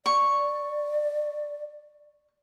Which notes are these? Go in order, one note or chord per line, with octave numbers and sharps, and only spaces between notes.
D5 C#6